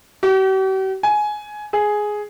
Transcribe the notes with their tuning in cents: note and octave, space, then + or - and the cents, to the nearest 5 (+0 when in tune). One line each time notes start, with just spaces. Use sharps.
G4 -45
G#5 +15
G#4 +5